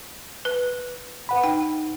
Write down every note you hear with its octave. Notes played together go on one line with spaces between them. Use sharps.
B4
B4 F#5 B5
D#4 G5